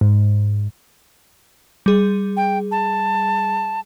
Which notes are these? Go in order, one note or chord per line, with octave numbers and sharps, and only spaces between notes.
G#2
G3 G#4
G5
A5